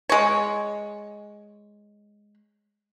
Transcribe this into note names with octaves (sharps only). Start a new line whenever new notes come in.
G#3 C#5